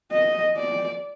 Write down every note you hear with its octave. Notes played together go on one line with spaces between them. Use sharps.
D#5
D5